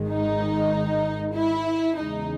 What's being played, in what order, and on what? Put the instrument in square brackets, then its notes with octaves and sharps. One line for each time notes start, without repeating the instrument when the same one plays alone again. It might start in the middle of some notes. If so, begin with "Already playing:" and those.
Already playing: [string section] G#1 G#2 D#3 G#3
D#4
E4
E2 C#3 G#3 D#4